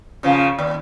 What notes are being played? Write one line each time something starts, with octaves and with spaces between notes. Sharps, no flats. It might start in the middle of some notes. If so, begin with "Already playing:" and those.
C#3 F3 A#3
D#2